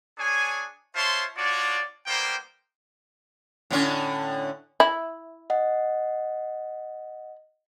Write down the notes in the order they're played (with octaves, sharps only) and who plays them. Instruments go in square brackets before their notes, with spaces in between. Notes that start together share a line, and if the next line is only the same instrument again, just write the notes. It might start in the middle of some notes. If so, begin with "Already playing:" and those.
[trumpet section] D4 G#4 C#5 G#5
F4 C5 C#5 E5 A5 C6
D4 F4 F#4 C#5 D5
G3 A#3 B3 F4 C5 G5
[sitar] A2 D3 C#4
[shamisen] E4
[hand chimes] D#5 F#5